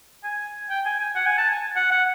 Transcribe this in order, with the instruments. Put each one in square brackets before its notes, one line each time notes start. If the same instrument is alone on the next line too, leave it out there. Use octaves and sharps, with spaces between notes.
[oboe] G#5
G5
G#5
G#5
F#5
G#5
A5
G#5
F#5
F#5